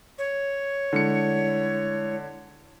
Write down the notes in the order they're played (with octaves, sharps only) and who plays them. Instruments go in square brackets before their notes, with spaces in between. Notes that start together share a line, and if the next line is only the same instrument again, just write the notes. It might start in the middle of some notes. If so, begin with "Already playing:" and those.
[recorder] C#5
[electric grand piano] D3 C#7 [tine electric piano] G#3 E4